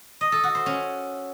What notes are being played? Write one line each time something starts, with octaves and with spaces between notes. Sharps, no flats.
D#5
A4
F#4
C5
C#4